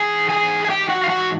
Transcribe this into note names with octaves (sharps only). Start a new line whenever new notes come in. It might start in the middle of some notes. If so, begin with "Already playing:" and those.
Already playing: G#2 E3 G#4 G#5
G#4 G#5
G#5
G4 G5
F#4 F#5
F5
F#4 F#5